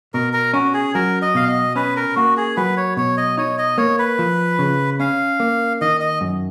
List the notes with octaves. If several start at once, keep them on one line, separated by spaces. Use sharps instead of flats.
B2 A#4
A#4
C#4 F#4
G#4
F#3 A#4
D#5
B2 F5
D#5
C#4 B4
A#4
A#3 F#4
G#4
F#3 B4
C#5
B2 C#5
D#5
D#4 C#5
D#5
A#3 C#5
B4
F3
C#3
C#4 F5
A#3
D#3 D#5
D#5
F#2